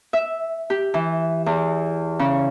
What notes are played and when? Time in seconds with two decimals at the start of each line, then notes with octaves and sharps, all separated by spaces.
0.13 E5
0.70 G4
0.94 E3
1.46 E2
2.19 C#3